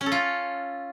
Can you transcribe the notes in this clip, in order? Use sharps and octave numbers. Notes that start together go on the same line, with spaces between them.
C#4
A4
F4